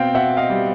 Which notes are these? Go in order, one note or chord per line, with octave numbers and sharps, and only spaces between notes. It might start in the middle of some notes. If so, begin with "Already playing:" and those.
Already playing: B2 C4 F5 G5
B2 E5 F#5
D#5 F5
G3